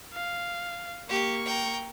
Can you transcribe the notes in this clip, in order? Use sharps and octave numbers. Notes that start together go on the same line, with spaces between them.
F5
A#3 G4 C#6
G5 A#5